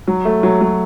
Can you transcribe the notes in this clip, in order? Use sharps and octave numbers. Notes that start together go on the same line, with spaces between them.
F#3
A3
F#3
F#3